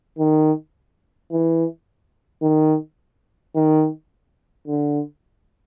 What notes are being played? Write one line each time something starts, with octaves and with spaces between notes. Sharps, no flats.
D#3
E3
D#3
D#3
D3